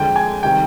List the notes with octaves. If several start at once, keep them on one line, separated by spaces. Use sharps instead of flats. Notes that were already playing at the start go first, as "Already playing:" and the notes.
Already playing: F2 D3 G#3 G5
G#5
C3 D#3 G3 G5